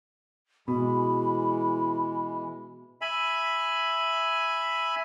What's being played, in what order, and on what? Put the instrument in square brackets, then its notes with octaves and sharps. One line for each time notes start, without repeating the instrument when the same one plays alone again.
[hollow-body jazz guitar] B2 [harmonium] E3 G#3 [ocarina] B5
[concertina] E5 G#5 B5